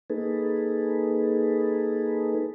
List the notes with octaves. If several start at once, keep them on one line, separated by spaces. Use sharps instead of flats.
A#3 D#4 G#4 A4 B4